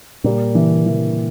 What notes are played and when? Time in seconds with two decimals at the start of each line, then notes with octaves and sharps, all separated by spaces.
0.24 A#2 G3
0.55 E3
0.86 E3